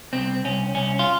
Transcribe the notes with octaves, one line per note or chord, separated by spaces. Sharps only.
C2 C4
C2 C#4
C2 C#4
F4